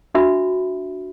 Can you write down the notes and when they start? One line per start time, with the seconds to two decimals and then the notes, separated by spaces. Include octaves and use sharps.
0.14 D4 F#4 E5 B5